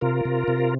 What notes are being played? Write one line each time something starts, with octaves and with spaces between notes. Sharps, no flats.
C3 F4 A#4
C3
C3